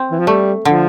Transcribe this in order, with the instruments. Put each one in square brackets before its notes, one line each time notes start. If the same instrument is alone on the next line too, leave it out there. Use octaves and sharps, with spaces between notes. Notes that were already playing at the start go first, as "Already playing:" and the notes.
Already playing: [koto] C4
[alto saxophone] E3
F3
[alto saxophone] G3 [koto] A3
[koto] D3 [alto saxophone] F3